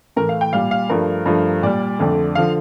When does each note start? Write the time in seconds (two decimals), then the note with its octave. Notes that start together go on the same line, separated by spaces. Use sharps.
0.17 A2 E3 A3 A#4
0.29 F5
0.41 G5
0.53 A#2 G3 F5
0.71 F5
0.90 G2 F3 A3 A#4
1.26 G2 F3 A3
1.63 A#2 G3 D5
1.99 F2 D3 A3
2.35 D3 F3 F5